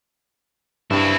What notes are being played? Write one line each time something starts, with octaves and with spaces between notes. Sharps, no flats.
G2 C4 E4